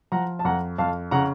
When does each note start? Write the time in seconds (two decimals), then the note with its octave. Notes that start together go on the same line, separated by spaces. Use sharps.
0.12 F3 F#5 A#5
0.39 A5
0.45 F2 F#5 A#5
0.78 F2 F5 A5
1.11 C#3 F#5 A#5